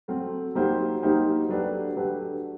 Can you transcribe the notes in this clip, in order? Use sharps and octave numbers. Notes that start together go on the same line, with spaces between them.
F#3 A3 C4
F#3 A#3 D#4 G4 C5
F#3 A#3 D#4 G4 C5
F#3 A3 D4 G4 B4
F#3 A3 D4 G4 B4